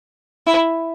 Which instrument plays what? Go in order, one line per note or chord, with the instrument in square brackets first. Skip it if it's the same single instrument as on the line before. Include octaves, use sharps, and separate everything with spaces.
[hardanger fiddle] E4